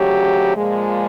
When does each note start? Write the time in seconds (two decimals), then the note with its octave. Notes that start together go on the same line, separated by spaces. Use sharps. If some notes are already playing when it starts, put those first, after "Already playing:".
Already playing: D2 C#3 F#3 G4
0.56 A#2 F3 G#3